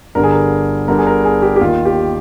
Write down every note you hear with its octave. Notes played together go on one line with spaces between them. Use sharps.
G1 G2 D3 A#4
G#4
A#4
G1 G2 D3 A#4
G#4
A#4
G#4
G4
G4
D#2 D#3 F4
G4